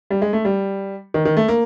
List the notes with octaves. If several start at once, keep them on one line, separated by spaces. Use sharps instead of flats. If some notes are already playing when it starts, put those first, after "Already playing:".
G3
G#3
A3
G3
D#3
D#3
A3
A#3